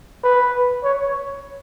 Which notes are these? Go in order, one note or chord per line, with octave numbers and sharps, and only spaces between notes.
B4
C#5